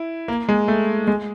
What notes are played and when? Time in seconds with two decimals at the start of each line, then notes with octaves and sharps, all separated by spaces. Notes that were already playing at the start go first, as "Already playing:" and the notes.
Already playing: E4
0.28 A#3
0.49 G#3
0.68 A3
1.07 G#3